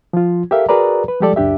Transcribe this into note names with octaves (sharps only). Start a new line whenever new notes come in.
F3 F4
G4 A4 A#4 E5 F5
F#4 G#4 A#4 B4 D5 A#5
B4
F3 G3 G#3 G4 A4 D5
C#2 F#2 D4 G4 E5